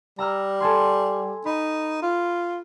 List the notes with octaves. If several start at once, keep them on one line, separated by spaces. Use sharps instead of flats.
G3 A#5 E6 F6
A4 G#5 C6
D#4 B5
F4